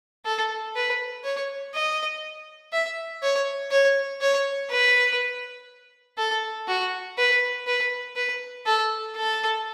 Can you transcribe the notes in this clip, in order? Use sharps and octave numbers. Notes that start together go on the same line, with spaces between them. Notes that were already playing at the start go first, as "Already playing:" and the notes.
A4
B4
C#5
D#5
E5
C#5
C#5
C#5
B4
A4
F#4
B4
B4
B4
A4
A4